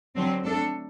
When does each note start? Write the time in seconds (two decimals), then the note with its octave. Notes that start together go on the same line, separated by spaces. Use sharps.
0.15 D3 F#3 C4
0.44 A3 D4 A4